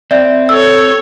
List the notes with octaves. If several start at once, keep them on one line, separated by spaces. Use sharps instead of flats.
C4 D5 E5
A4 C#5 E6